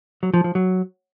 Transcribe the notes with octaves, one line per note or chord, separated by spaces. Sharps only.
F#3
F3
F3
F#3